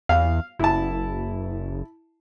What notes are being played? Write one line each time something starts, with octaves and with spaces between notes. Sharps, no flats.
E2 F5
F#1 E4 A5